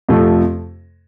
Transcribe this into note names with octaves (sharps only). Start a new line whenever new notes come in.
F2 C3 F3 A3